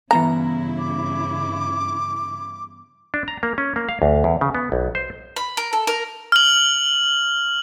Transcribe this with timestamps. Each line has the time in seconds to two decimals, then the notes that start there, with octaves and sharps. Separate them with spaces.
0.11 G2 C#3 E3 B3 E4 A#5 A#6
0.79 D6
3.14 D4
3.28 A#5
3.43 A#3
3.58 C#4
3.76 A#3
3.89 F5
4.02 D2
4.24 E2
4.41 C#3
4.55 B3
4.72 B1
4.95 C5
5.36 B5
5.57 A#4
5.73 A4
5.87 A#4
6.32 F6 F#7